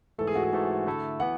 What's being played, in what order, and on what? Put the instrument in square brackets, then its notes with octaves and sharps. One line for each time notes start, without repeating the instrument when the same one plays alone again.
[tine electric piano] G#2 E3 A3 [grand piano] A4
[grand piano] G#4
F#4
G#4
[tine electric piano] G#2 E3 A3 [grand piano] A4
[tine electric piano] D3 A3 E4 A4
[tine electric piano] E3 B3 [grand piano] F#5